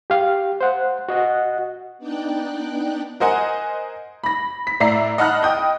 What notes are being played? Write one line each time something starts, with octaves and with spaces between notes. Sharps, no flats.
G4 F5
C5 F#5
F#4 D#5 F#5
B3 D4 D#4 D5 G5 F#6
A#4 C5 D#5 F#5 G#5
B5 A#6
B6
A2 D5 E5 A#5 C7
D#5 F#5 A5 B5 F6 F#6
D#5 G5 D#6 G6